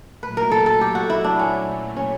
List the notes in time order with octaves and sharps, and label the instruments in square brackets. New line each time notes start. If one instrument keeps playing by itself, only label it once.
[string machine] A#2 F#3 A3 [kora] B4
[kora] A#4
A4
A4
G4
F#4
E4
D4
C#4
C#4